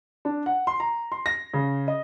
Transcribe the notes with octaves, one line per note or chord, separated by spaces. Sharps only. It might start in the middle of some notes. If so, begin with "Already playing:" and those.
D4
F#5
C6
A#5
C6
A#6
C#3
D#5